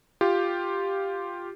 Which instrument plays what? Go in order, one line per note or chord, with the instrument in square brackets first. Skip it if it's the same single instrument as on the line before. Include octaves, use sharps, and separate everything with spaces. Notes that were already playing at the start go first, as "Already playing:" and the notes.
[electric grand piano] F4 G4